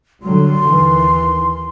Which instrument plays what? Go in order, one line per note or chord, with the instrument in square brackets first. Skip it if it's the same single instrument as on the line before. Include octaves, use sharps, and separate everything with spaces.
[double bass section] D3 F#3 G3 [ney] C6
[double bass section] D#2 E3